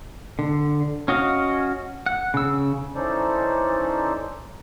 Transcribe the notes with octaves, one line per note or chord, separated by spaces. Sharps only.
D3
C#4 F#4 D#5 F5
F#5
C#3 E6
E3 C#4 D#4 A4 C5 D5